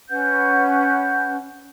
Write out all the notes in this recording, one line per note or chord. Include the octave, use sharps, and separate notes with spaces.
C#4 B4 F#5 G6